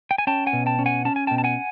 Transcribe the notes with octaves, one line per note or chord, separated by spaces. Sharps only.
G5
G#5
C#4 G5 A5
F#5 G#5
B2
G5 A5
C#4
F#5 G#5
C#4 A5
G#5
B2 G5 A5
A5
F#5 G#5